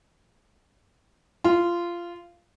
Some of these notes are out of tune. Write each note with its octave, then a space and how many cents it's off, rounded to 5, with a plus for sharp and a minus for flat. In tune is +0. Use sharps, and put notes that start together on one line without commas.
F4 -15